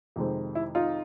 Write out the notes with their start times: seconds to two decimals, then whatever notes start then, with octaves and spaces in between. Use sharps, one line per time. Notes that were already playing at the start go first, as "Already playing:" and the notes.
0.16 F2 C3 D#3 G#3 C4
0.55 E4
0.75 D#4 F4